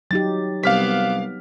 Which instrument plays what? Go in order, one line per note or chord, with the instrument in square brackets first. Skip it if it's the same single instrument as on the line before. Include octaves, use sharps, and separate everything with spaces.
[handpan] F#3 D#4 G4 [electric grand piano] A6
[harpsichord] C2 [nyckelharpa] B3 D6 [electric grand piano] F5 F6 B6